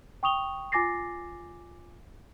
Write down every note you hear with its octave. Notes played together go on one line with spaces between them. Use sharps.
G5 C#6 D#6 F7 G7
F4 G#5 D6 A6 A#6 C7